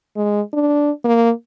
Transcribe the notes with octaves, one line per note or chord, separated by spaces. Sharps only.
G#3
D4
A#3